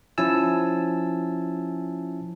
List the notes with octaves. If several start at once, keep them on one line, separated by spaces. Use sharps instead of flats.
F3 C#4 E4 G#5 A5 E6